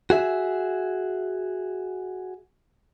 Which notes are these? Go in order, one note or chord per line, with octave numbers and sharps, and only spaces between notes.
F#4 G#4 E5